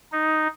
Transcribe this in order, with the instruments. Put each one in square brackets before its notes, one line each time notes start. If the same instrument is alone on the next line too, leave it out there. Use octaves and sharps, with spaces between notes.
[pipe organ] D#4